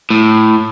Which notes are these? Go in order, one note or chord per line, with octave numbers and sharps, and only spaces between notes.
A2